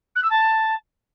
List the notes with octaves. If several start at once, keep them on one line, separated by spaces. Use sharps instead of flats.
F#6
E6
A5